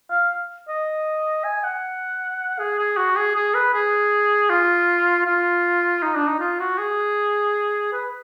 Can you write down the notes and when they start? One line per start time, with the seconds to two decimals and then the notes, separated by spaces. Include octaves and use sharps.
0.11 F5
0.68 D#5
1.44 G#5
1.64 F#5
2.59 G#4
2.79 G#4
2.97 F#4
3.17 G#4
3.35 G#4
3.54 B4
3.74 G#4
4.50 F4
5.26 F4
6.03 D#4
6.15 D4
6.27 D#4
6.40 F4
6.59 F#4
6.79 G#4
7.93 B4